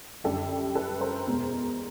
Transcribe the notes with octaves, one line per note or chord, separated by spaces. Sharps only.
F#2 D3 G3 G4 A4
A4 B4
A#4 C5
E2 B2 G#3